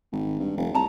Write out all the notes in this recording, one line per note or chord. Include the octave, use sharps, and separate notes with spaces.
G#1
G2
F1
C2 A5 A#5